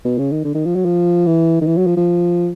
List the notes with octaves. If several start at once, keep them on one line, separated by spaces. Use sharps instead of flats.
B2
C#3
D#3
D3
D#3
F3
F#3
F3
E3
D#3
E3
F#3
F3
F3